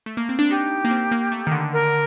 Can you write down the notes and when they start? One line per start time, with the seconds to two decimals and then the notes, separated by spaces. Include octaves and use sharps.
0.06 A3
0.17 A#3
0.29 C4
0.39 D4
0.50 D#4 G4
0.85 A#3
0.91 C4
1.11 A#3
1.32 A3
1.47 D#3
1.52 D3
1.73 A#4